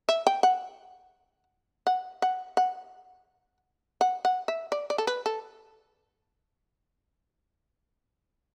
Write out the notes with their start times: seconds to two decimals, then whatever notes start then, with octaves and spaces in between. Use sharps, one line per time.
0.09 E5
0.27 G5
0.43 F#5
1.87 F#5
2.22 F#5
2.57 F#5
4.01 F#5
4.25 F#5
4.48 E5
4.72 D5
4.90 D5
4.98 A4
5.07 B4
5.26 A4